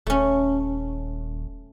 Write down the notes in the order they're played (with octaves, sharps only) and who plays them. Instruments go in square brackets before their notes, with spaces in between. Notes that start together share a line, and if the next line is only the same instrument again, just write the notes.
[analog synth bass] D#1 [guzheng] A3 C#4